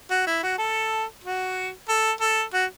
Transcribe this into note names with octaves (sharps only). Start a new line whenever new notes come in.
F#4
E4
F#4
A4
F#4
A4
A4
F#4